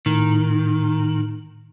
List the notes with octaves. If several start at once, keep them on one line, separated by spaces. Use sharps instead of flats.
A2 D#3